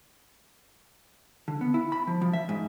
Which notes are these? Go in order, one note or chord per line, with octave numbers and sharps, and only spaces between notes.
D3
B3
E4
B5
F3
F3
E5
G#2